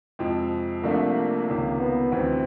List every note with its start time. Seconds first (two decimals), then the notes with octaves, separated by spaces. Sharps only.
0.19 F2 C3 F3 G#3 C4
0.83 C2 C3 F3 A3 A#3 D4
1.48 C#2 C3 D#3
1.80 B3
2.12 D2 C3 E3 C4